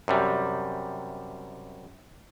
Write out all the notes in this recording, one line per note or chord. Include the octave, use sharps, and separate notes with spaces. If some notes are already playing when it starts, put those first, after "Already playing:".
F#2 C3 G3